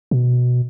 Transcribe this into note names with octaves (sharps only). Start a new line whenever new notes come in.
B2